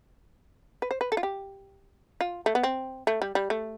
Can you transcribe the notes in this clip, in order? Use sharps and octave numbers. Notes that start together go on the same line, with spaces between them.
B4
C5
B4
A4
F4
G4
F4
A3
B3
C4
A3
G3
G3
A3